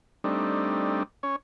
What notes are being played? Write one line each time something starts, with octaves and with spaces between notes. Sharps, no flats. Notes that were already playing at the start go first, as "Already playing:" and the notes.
G3 A3 C4 D4 D#4
C#4 C#5